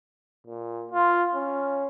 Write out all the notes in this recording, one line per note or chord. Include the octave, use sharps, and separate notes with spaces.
A#2
F4
C#4